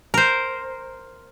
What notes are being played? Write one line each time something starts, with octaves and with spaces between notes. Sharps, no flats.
A#4 C5